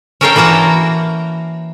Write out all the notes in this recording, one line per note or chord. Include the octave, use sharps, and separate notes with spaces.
C#4 A4 A#4 C#5 F5 G5
E3 A#3 F#4 A5 A#5